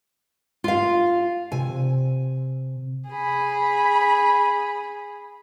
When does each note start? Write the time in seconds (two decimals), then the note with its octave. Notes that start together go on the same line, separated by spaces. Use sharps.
0.64 F4 F5
1.52 C3 G#5
3.10 G#4 B5